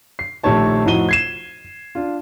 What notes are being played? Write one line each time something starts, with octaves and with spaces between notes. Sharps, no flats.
C7
A#1 D#3 A3 G4 C#5 A5
F2 A2 D#4 F#4 D#7 G7
G#6 C7 E7
D4 F4